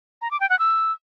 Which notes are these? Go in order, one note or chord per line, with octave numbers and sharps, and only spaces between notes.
A#5
D6
G5
F#5
E6